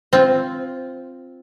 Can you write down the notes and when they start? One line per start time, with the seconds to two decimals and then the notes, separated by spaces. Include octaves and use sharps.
0.13 C4 F4